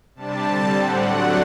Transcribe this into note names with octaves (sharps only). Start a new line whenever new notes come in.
C3 G3 D4 A5
D3 G3 C4
A2 G3 C4 F#5
D3 F#3 A3 D4